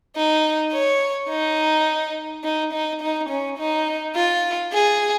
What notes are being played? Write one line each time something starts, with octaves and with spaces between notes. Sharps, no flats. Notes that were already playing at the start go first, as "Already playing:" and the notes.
D#4
C#5
D#4
D#4
D#4
D#4
C#4
D#4
F4
G#4